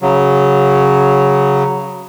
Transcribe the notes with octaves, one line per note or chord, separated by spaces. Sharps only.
C#3 F#3